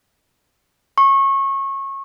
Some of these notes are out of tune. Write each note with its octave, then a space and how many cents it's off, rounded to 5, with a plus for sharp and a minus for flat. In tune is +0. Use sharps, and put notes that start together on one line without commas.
C#6 -25